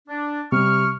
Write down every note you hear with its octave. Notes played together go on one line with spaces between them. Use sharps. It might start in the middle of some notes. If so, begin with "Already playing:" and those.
D4
C3 G3 C#6 F6